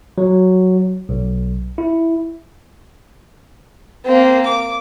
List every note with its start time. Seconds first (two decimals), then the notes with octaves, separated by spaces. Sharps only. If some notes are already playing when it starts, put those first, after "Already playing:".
0.18 F#3
1.09 B1
1.78 E4
4.05 A#3 C4
4.46 D6